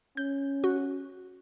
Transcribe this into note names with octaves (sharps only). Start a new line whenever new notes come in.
C#4 G6
F#4